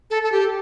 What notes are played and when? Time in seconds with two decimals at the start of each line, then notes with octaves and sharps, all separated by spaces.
0.10 A4
0.23 A4
0.32 G4